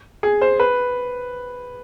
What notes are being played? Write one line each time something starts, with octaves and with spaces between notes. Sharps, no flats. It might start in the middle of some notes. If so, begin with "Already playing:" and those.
G#4
C5
B4